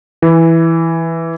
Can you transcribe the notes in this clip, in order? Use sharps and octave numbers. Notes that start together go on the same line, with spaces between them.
E3